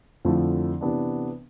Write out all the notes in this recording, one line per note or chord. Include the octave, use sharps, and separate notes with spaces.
F2 D3 F3 A3 E4
C3 E3 B3 D4